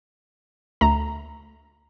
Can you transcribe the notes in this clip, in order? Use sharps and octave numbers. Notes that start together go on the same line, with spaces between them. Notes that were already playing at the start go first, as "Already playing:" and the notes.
D2 A3 A#5